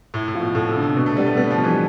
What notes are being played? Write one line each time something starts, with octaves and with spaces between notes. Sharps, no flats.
A2 E4
A2
F3
B2
A2 A3
C3
D3
C3
B2
A3
G3 B3
A3
G3 B3
F3
B2
E3